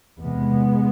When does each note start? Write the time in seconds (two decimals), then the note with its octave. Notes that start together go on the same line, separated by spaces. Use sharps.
0.19 E2 C3 G#3 B3